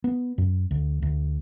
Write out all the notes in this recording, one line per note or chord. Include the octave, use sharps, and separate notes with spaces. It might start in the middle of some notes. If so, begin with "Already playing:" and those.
B3
F#2
D2
D2